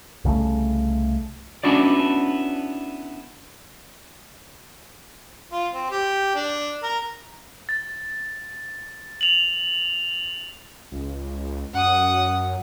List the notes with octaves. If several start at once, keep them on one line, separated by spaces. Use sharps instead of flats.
C2 C#3 G3 A3
B3 C#4 D4 E4 F#4 D5
F4
C4
G4
D4
A#4
A6
F7 F#7
C#2
F#2 F#5 D#6